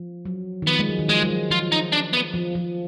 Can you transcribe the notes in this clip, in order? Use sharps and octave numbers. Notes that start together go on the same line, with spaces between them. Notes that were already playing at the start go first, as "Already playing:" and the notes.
Already playing: F3
F#3
D#3
F3 B3
G#3
F#3
D#3
F3 G#3
G#3
F#3
F3 F4
D#4
D4
B3
F3
F3